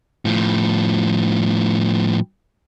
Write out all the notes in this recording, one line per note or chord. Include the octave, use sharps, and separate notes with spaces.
A2 F3